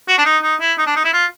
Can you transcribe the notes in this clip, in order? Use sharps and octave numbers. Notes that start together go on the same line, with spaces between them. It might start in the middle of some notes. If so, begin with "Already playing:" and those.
F#4
D4
D#4
D#4
E4
D#4
D4
D#4
E4
F4